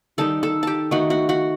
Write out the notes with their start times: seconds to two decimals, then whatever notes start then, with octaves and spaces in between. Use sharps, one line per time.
0.18 D#3 G3 D#4 A4 A5
0.43 A4 A5
0.63 G4 G5 A5
0.91 D#3 A3 D#4 F#4 F#5
1.10 F#4 F#5
1.29 F#4 F#5